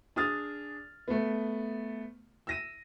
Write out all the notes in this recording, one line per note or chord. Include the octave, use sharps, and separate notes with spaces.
D4 G#4 D#6 F6 A6
A3 B3
E6 A#6 D#7